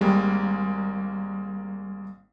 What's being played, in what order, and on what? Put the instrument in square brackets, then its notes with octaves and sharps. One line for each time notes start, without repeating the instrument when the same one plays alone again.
[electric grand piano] G#1 G#3 A#3 [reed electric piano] G3